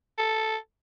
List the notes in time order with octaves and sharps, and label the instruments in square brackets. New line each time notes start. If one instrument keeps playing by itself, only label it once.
[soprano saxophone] A4